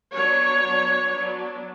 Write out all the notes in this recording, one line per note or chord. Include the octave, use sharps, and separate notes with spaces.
F#3 B3 D4 C#5
F#3 B3 D4
F#3 B3 D4